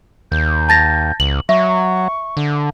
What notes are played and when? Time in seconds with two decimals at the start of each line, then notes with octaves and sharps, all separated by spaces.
0.32 D#2 G6
0.69 A5 A6 A#6
1.20 C#2 F#7
1.49 F#3 E5 C#6
2.37 D3